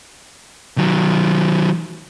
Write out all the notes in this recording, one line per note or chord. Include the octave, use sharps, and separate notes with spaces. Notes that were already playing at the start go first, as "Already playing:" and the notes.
D#3 F#3